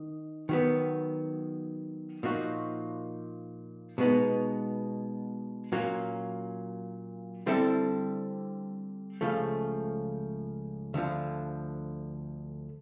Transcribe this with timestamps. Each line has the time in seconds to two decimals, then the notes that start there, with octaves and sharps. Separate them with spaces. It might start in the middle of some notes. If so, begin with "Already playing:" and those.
Already playing: D#3
0.49 D#3 F#3 B3
2.23 A#2 F3 A#3 D#4 F#4
3.98 B2 G#3 B3 D#4
5.72 A#2 F#3 A#3 C#4
7.46 D3 G3 C4 E4 A4
9.21 C#2 C#3 F3 A3
10.94 D2 D3 F3